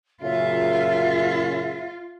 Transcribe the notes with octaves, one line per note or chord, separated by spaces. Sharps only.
F#2 A#2 C#3 F4 E5